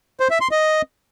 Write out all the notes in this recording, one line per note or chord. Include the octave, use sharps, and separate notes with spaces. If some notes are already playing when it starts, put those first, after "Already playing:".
C5
E5
C6
D#5